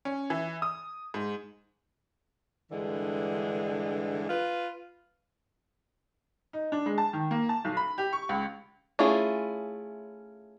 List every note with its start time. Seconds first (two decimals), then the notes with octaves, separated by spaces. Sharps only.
0.05 C#4
0.30 E3
0.62 D#6
1.14 G#2
2.71 G2 D3 E3 G#3
4.28 F4 B4
6.53 D#4
6.72 D4
6.86 G#3
6.98 A5
7.13 D#3
7.31 A#3
7.49 A5
7.65 B1
7.77 B5
7.98 G4
8.13 C#6
8.29 C#2
8.99 A3 C#4 E4 F4 G#4